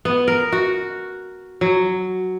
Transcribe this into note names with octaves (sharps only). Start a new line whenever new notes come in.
B3
A#4
F#4
F#3